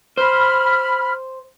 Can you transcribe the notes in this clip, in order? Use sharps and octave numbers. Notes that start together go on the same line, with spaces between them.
C5 B5 F6